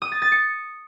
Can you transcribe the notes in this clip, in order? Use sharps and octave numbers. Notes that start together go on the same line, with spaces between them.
D#6
A6
A6
C#7